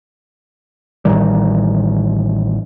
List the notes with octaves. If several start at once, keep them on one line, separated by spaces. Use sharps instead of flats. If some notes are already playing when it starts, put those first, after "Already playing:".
A1 D#3 G3